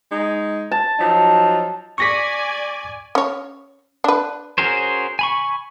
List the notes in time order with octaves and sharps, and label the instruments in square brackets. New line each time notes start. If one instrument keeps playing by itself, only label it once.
[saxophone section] G#3 D#4
[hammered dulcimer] A5
[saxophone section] F3 F#3 D#4
[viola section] D5 G#5 [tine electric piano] C#6 A#6 B6
[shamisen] C#4 C#5
D4 B4
[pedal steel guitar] C#4 F#4 G#4 A#4 C5
G#5 B5 C#6